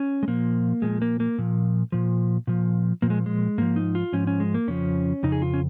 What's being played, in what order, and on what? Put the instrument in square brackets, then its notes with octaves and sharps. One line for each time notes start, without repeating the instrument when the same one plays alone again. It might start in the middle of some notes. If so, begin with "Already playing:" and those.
Already playing: [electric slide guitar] C#4
G#3
A#2 F3 A#3
A#2 F3 G#3
A#3
A#3
A#2 F3
A#2 F3
A#2 F3
A#2 F3 A#3
G#3
G#3
G#2 F3 A#3
D#4
F4
G#2 F3 C#4
C#4
G#3
A#3
F2 C#3 F3 C#4
F2 C#3 D#4
G#4
F4
C#4